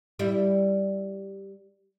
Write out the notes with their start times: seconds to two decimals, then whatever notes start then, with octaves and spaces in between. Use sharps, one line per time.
0.19 G3 E4